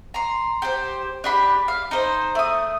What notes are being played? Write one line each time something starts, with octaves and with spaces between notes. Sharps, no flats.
A#5 C6
G4 C5
D4 G4 B5
F5
D#4 C5
A3 D#6